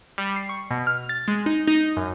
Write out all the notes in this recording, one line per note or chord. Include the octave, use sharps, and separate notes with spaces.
G3
C7
C#6
B2
F6
A6
G#3
D#4
D#4
F#2